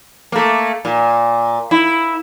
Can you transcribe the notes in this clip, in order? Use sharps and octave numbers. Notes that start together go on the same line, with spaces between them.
A3 A#3
A#2
E4